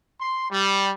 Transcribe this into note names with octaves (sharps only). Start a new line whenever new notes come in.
C6
G3